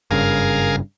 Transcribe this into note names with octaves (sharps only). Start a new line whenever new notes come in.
F#1 G2 C#3 G#4 A#4 F5